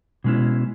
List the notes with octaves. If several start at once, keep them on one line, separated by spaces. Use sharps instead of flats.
B2 G#3 C#4 E4